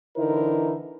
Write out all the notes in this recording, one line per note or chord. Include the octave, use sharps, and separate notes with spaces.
D3 E3 D#4 E4 A#4 C5